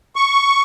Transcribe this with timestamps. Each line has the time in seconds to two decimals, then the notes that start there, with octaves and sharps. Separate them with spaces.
0.16 C#6